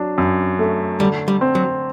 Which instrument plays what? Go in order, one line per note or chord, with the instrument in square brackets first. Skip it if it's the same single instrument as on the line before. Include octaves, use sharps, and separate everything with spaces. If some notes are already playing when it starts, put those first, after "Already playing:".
Already playing: [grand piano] F#3 D4
F#2
A3
[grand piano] D3 [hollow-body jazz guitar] G3
[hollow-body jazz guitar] G3
[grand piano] C4
[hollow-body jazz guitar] F#3